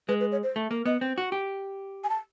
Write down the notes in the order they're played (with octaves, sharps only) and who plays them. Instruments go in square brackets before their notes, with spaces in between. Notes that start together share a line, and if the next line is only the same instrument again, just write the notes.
[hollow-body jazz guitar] G#3 [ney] B4
[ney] B4
C#5
C5
[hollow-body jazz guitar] A3
[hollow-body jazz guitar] A#3 [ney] A#4
[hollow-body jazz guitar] B3 [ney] D#5
[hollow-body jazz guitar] C4
F#4
G4
[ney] G#5
A5